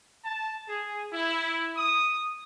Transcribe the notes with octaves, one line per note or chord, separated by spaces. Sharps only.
A5
G#4
E4
D#6